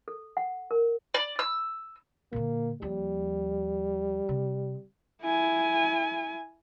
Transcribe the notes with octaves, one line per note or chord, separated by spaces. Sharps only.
A4
F#5
A#4
D5
E6
A#2 D3 A#3
D#2 F3 G3
C3
E4 G#5